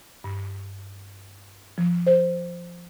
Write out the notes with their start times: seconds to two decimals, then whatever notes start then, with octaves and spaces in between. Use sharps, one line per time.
0.24 G2
1.78 F3
2.07 C5